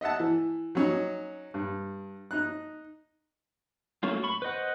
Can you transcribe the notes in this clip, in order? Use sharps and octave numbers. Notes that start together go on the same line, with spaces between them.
D#5 E5 F#5 A5
E3
F#3 C#4 D#4
G2
D#4 F#6
F#3 A3 A#3 C#4 F4
B5 C#6
B4 C5 D#5 F#5